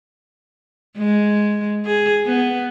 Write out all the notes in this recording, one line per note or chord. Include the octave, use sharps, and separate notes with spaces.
G#3
G#4
B3